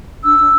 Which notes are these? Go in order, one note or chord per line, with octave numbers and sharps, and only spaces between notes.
D4 E6
D4